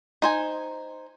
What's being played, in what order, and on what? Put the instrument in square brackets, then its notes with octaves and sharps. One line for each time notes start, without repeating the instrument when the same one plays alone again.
[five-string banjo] D#4 C5 G#5